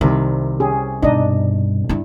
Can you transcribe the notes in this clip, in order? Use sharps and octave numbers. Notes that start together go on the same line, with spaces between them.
C2 C3 D#3
C#4 G4 G#4
G2 B2 D4 D#4 D#5
G2 E4